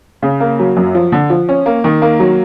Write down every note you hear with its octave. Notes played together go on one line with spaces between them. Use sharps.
C#3
A#3
F#3
F#2
F3
D3
F3
C#4
A#3
D#3
A#3
F#3